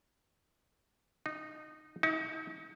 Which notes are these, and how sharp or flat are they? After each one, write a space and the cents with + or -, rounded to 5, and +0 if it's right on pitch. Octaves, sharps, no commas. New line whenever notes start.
D#4 -15
D#4 +40